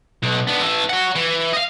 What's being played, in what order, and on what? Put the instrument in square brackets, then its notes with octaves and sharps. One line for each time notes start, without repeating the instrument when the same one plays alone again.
[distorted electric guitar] B1
B3 D4
E3 A4
C#5 F#5
E3
D#5 F5